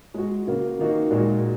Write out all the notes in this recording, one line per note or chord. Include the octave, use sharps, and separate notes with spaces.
G#3 F#4
C#3 A#3 F#4
D#3 A#3 D#4 F#4
A#2 G#3 F#4